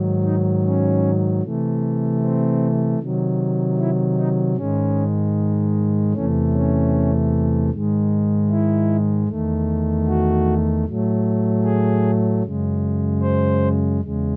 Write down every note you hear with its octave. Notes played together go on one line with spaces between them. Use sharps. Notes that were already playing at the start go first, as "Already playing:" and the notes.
Already playing: G#2 D#3 F#3
D#4
C#4
C3 E3 A3
C4
C3 D#3 F#3
E4
D#4
G#2 D#3 G#3 C#4
E2 C3 E3 A3 C#4
C#4
G#2 D#3 G#3
E4
E2 D#3 A3
F#4
A2 F#3 A3
G#4
F#2 C#3 G#3
C5
E2 C#3 G#3